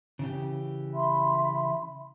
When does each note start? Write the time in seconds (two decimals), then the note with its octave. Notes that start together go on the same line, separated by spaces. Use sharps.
0.19 C#3 E3 G4
0.94 E5 B5 C6